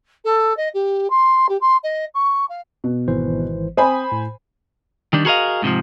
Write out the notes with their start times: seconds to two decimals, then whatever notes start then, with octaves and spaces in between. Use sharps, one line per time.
0.24 A4
0.57 D#5
0.74 G4
1.10 C6
1.49 G4
1.61 C6
1.83 D#5
2.14 C#6
2.49 F5
2.84 B2
3.08 G#1 E3 C5
3.77 C4 C5 G#5 B5 D#6
4.12 A2
5.13 D#3 G3 D4
5.25 F#4 G#4 A#4 B4 D#5 F5
5.62 G#2 C3 E3 F3